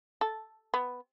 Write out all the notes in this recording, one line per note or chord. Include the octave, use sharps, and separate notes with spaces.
A4
B3